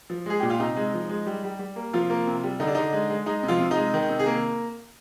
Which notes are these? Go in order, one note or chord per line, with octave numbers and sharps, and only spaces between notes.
F3
G#3 G#4
A#2 G4
F4
C3 D#4
G#3
F3
G#3
G3
G3
G3
A#3
C3 F3 F4
A#3
C3
G3
D3 D#4
D4
D3 D#4
G#3
G#3
G#3 D#4
C3
F3 F4
C3
D#4
G#3
D#3
C3
G#4
A#3